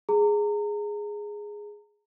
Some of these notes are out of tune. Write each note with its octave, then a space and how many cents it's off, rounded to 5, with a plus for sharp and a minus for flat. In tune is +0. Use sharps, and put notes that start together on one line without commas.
G#4 +0 A#5 -30